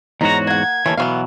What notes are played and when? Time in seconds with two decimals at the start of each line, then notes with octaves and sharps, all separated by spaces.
0.21 E2 G#2 D#4 F#4 C#5 A#5
0.47 A#3 F#5 G#6
0.86 D#2 D#3 E3 A4 C#5
0.97 B2 E3 F#3 B3 C#5 F5